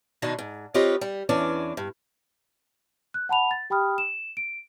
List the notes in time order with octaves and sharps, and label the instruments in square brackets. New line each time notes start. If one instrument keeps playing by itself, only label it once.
[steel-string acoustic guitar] B2 D#3 D4 D#4
G#2
C4 F4 G4 B4 C#5 D#5
G3
E2 E3 C#4 D4 D5
G2
[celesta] F#6
F#5 A5 B5 F7
A6
G4 G5 B5 D#6 F6
E7
D7